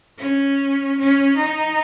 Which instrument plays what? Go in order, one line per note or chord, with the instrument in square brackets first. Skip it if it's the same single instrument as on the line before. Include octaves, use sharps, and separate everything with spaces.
[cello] C#4
C#4
D#4